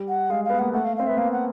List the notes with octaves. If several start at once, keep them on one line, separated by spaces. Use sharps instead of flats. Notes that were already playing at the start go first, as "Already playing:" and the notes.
Already playing: G3
F#5
G#3 F5
F5
B3
A#3 F#5
A3 F#5
F5
C4 F5
B3 E5
A#3 F5
F#5